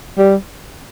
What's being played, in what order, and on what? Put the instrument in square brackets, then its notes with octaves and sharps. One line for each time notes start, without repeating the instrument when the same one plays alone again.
[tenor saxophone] G3